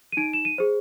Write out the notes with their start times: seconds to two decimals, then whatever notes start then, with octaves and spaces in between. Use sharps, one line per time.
0.12 D#7
0.17 D#4 D7
0.33 E7
0.45 D#7
0.58 G#4 C5